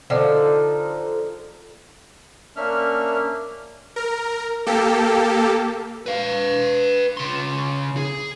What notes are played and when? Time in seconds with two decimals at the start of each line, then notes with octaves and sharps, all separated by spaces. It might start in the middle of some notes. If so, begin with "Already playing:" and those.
0.10 D3 F3 D#4
2.57 A#3 C#4 D4 E5 F6
3.96 A#4
4.66 A#3 G4 A4
6.06 B4 F5
7.17 C#3 C6
7.97 G#4